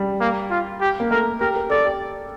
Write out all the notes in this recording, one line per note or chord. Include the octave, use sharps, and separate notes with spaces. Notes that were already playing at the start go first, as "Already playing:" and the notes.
Already playing: G3
A#3
F4
G4
A#3
A3 A#4
G4 A#4
A#4
A4 D5
G4